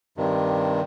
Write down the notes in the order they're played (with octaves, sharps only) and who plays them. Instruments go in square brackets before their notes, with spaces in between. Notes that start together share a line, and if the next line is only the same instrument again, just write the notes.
[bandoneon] G2 C3 D#3